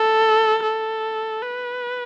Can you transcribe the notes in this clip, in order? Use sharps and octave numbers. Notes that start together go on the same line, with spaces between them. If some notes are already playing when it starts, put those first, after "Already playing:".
Already playing: A4
A4
B4